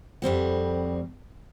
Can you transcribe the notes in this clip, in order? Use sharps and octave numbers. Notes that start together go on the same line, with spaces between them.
F2 G3 C4 F#4